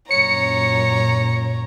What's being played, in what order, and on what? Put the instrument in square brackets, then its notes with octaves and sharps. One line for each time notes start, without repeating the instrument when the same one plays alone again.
[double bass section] F#2 A#2 [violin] C#5 A#5 [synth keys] C#7